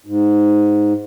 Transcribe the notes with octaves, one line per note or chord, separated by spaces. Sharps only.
G#2